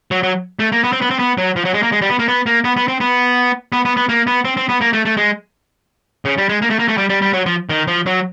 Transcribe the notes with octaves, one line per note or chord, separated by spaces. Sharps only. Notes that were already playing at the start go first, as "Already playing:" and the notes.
F#3
F#3
A3
A#3
B3
C4
B3
C4
B3
F#3
F3
F#3
G#3
A#3
G#3
G3
B3
A#3
B3
A#3
B3
B3
C4
B3
B3
B3
B3
A#3
B3
C4
C4
B3
A#3
A3
A3
G#3
C#3
G3
G#3
A#3
A3
A#3
A3
G3
G3
G3
F#3
F3
D#3
F3
F#3